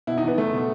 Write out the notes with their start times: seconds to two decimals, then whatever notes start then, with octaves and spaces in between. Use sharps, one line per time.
0.07 B2 E4
0.18 D#4
0.23 E2 B3
0.38 F#1 A3
0.54 B2